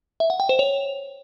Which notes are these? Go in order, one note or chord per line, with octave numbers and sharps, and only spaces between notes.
E5
F#5
G5
C5
C#5